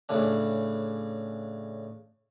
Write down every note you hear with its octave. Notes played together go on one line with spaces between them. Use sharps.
A2 C#3 D4